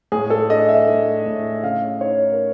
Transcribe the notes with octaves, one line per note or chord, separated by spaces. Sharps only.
A2 G#4
A4
D4 D#5
E5
A3
A2
C#3 F5
D#4 C#5
A#4